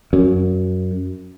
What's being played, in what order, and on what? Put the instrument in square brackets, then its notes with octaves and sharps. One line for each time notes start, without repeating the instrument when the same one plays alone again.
[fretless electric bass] F#2